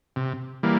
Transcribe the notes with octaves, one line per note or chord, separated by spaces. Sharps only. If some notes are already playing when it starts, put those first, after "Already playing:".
C3
E3 G3 A#3